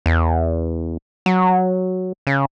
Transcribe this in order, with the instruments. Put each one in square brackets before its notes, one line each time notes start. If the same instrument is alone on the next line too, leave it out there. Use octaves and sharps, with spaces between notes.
[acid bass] E2
F#3
C#3